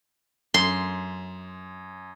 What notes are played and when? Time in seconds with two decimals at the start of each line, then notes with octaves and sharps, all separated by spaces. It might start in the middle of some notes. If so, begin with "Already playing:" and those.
0.54 F#2 C6